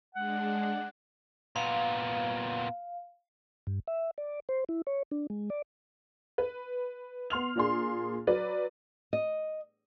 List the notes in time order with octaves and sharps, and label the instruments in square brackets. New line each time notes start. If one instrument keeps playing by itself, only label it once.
[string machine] G#3 D4 [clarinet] F#5
[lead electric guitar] A#2 B3 [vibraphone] F5
[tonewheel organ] G2
E5
D5
C5
E4
C#5
D4
G#3
D5
[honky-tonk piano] B4
B3 C6 F6 F7
A#2 A#3 D4 G#4 C6
F#3 B4 D5
[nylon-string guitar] D#5